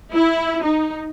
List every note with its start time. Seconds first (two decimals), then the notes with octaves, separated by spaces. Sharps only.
0.13 E4
0.63 D#4